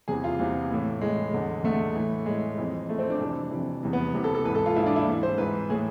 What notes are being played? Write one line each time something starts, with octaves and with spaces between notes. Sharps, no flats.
E2 C3 E3 G#4
F4
E2 C3 E3
A2 E3
A2 E3 G#3
E2 D3
E2 D3 A3
A2 E3
A2 E3 G#3
F2 E3
F2 E3 A3
C4
D4
F2 C3 E3
F2 C3 E3
E2 C3 E3
B3
E2 C3 E3
A4
A4
G#2 E3 B4
A4
F4
G#2 E3 E4
D4
E4
G#2 E3
C5
G#2 E3 B4
A2 E3 G#4